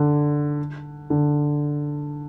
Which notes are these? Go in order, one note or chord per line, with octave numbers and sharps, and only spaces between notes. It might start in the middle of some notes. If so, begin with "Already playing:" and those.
Already playing: D3
D3